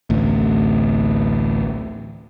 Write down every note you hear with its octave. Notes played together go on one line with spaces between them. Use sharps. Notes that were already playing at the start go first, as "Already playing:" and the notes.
A1 D2 A2